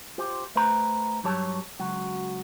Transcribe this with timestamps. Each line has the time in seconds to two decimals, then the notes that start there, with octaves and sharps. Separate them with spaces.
0.18 F4 G4 C5
0.55 A3 B4 C5 A#5
1.24 G2 F#3 G4 C#5 A5
1.79 C#2 F#3 F#4